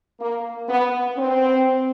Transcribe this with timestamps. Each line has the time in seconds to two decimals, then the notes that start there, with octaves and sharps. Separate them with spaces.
0.20 A#3
0.68 B3
1.17 C4